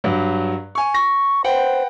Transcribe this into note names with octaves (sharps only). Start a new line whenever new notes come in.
G2 F#3
G#5 C#6
C#6 A#6
B4 C5 F#5 G5